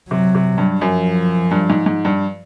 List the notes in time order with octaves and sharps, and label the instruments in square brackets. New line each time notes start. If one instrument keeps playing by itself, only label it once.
[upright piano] C3 [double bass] F#3
[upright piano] C3
G2
[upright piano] F#2 [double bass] F3
[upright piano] G2
G#2
G#2
G2